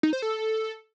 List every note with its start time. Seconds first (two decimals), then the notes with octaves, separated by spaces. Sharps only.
0.03 D#4
0.13 C5
0.22 A4